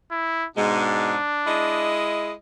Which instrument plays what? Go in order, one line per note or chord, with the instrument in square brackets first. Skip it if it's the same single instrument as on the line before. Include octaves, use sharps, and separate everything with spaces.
[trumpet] E4
[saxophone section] G#2 B2 G#3 [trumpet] D4
[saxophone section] G#3 E4 D#5